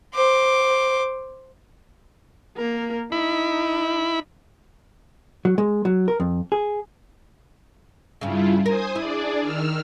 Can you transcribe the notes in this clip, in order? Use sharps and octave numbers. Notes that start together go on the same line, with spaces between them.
C5 D6
A#3 A#4
D#4 E4 B5
F#3
G#3
F#3
A#4
F2
G#4
G2 C#3 E4 F4
A#4 C5 G#5 D#6
D4 E4 G#4 D5
D#3 E6 F6